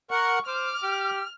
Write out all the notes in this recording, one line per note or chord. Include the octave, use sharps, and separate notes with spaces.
A#4 F#5 C#6
C5 D6 F6
G4